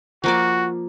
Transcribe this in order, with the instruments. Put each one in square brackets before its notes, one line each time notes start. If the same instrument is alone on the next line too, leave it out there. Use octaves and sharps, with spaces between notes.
[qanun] F3 A#3 D5 [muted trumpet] F#4